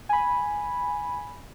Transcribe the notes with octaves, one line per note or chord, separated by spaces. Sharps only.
G#5 B5